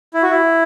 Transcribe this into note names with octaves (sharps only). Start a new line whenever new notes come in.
E4
F#4
E4